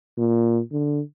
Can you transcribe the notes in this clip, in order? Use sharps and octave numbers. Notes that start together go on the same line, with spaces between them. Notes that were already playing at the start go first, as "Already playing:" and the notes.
A#2
D3